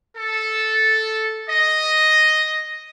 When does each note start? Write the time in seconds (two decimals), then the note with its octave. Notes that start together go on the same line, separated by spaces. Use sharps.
0.16 A4
1.49 D#5